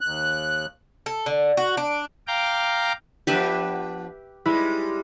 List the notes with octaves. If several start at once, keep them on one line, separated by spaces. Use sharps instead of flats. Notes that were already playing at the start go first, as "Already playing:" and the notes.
D#2 F#6
A4
D3
F#4
D4
F5 G5 A#5 D6
F3 B3 D4 G4 B4 E5
G3 G#3 E4 B4